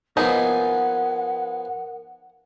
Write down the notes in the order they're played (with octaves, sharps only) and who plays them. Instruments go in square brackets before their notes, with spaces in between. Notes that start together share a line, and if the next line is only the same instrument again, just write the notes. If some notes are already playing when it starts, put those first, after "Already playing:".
[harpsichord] F3 B3 G#4 [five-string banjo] D#4 [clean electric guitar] A#4 F5 G#5 [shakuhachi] F#5